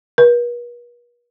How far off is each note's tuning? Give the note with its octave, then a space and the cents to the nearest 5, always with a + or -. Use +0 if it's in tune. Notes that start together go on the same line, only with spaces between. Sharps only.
B4 -45